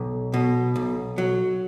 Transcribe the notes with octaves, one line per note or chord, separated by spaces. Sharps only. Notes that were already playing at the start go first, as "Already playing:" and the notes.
Already playing: B1
B2
B1
F#3